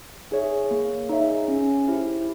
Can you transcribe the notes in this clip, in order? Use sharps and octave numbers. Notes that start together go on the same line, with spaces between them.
D#4 G#4 C#5 E5
A#3
D#4 G#4 C#5 E5
C#4
E4 G4 C5